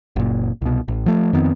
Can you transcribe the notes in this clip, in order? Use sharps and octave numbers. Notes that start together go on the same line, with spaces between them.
F#1 A#2
C2 B2
A1
F3 A3
F2 D#3 B3 C4